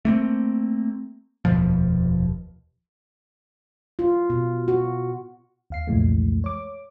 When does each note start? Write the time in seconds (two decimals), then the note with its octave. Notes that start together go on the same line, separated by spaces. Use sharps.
0.05 A3 A#3 C4
1.45 F1 D#2 B2 F3
3.99 F4
4.30 B2
4.68 F#4
5.70 D#2 F5 C7
5.87 C2 F2 A#2 E3 G#3 A3
6.44 C#5 D6